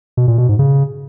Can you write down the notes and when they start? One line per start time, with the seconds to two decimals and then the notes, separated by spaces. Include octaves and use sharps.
0.17 B2
0.28 A#2
0.38 B2
0.49 G#2
0.59 C#3